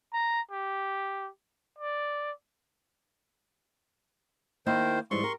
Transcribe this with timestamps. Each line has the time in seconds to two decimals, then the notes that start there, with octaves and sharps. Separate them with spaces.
0.13 A#5
0.51 G4
1.78 D5
4.66 D#3 A#3 E4 C5 D#5
5.11 G#2 E3 G3 C6 C#6
5.24 G4 A#4